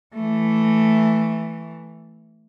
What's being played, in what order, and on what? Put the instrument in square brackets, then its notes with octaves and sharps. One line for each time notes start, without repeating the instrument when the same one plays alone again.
[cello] E3 A3